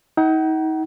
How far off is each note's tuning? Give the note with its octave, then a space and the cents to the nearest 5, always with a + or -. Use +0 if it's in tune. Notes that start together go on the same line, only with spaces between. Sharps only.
D#4 +35 F#5 +40